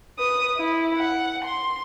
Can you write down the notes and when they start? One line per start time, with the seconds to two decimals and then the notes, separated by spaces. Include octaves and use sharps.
0.18 B4 D#6
0.58 E4
0.97 F#5
1.44 C6